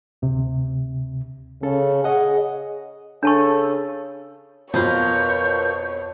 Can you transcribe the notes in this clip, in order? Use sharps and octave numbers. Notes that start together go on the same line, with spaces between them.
D2 C3
C#3 C#4 A4
G#4 C#5 D#5 F#5
C#3 D4 A4 A5 C#6
F2 B2 F4 A#4 B4 C#5 G6